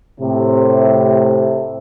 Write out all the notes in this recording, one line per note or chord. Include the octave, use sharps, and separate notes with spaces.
A2 C3